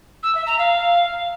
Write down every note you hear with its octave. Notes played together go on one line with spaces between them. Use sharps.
E6
E5
A#5
F5